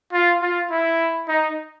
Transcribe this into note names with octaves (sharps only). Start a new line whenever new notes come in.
F4
F4
E4
D#4